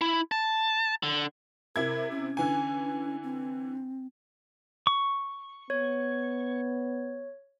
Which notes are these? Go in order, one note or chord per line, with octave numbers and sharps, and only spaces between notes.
E4
A5
D3
C3 E4 A#4 G#6
C#4
D3 E3 G#5
C4
C#6
B3 C#5